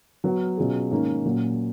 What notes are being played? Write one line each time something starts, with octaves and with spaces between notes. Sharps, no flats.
F#3 B3 F#4
B2 F#3 C#4 F4 G#4
G#2 D#3 A#3 C#4
A#2 F#3 C#4 F#4